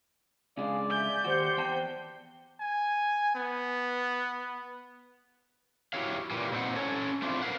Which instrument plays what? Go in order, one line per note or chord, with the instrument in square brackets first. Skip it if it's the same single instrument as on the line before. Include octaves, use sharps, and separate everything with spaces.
[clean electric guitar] C#3 G#3 D4 [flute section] G#4 F5 [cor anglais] D5
[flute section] E5 G#5 [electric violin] G6
[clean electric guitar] D#2 F#4 [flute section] G4 C5 F#5
[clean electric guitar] E2 G5 A5
[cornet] G#5
B3
[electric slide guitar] E4 F#4 G4 C#5 F5
A#2 E3 G3
A#2 C4 D#4 F#5
C#4 A4 C#5
A3 C4 D4 E4 F4
A#4 B4 F5 F#5